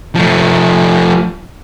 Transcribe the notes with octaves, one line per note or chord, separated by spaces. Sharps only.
F3 A3